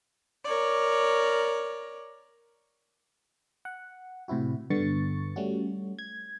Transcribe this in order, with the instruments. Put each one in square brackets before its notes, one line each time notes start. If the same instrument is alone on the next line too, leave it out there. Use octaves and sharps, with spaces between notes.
[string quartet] A#4 C#5 D5
[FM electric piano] F#5
A2 C3 C4 E4 F#4
G2 D3 B3 C#6 A6 C#7
G3 A3 C#4 F#4
G#6